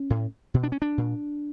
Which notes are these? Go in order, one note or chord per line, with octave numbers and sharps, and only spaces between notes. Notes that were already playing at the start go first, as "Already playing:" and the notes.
Already playing: C#4
A2
B2
D4
C#4
D4
A#2